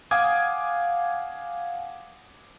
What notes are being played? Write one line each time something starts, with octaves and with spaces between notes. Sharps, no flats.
F5 F#5 G#5 D6 D#6 G#6